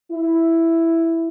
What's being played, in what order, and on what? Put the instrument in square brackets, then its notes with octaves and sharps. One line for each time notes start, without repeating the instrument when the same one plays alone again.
[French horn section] E4